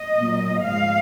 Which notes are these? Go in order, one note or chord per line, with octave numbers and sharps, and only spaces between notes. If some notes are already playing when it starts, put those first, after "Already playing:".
Already playing: D#5
A#2 F#3 A#3
G#2 F3 G#3 F5